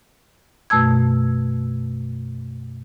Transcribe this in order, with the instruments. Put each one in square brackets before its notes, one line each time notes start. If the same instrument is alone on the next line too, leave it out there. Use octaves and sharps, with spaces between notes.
[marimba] F#2 B2 A3 A5 E6 G#6